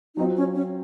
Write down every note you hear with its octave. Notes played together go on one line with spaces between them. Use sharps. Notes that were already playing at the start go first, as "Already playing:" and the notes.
F#3 C4 D#4 F4
C#4
C#4